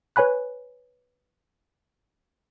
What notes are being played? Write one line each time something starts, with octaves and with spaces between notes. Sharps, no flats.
B4 C#5 G#5 B5 F#6